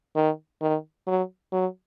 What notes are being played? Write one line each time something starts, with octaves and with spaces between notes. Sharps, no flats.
D#3
D#3
F#3
F#3